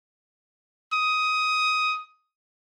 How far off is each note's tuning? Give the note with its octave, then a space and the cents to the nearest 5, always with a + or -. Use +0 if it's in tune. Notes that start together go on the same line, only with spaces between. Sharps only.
D#6 +15